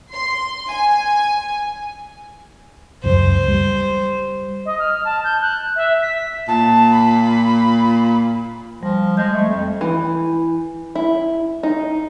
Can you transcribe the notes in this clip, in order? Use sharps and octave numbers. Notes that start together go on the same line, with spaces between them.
C6
G#5
C#2 F#2 C#3 C5
G3
D#5
F6
A5
G6
F#6
E5
B6
A#2 A5
B5
F3 G3
G#3 G6
A3
F2
E3
E4
D#4